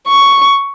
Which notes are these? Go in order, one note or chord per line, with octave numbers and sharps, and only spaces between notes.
C#6